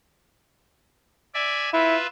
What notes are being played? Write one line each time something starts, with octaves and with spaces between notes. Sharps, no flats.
D5 E5 G#5
E4 F4 B4 E5